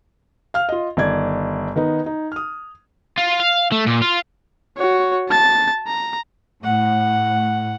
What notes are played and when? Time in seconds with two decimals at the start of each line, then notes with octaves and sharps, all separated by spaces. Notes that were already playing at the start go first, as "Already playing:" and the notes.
0.54 F5 F6
0.69 F4 D#5
0.97 G1 D#3 D5 G#6
1.76 D#3 B3 D#4
2.06 D#4
2.32 D#6 F6
3.18 F4
3.40 F5
3.72 A3
3.86 A#2
4.02 F4
4.77 F#4 C#5
5.29 A5 A6
5.87 A#5
6.64 A2 F#5